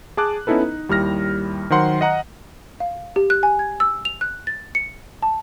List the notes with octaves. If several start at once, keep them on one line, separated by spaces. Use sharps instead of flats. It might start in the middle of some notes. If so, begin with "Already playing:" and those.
G#4 A5 D6 F#6
B3 C#4 D#4 E4 A4 B4
D#4
D#2 G3 E4 F6 A#6
D#3 F#3 A#4 C5 F#5 C6
D#5 F#5 A#5 D#6 F#6
F5
G4
F#6
G#5
G#6
E6
F7
F#6
A6
C#7
A5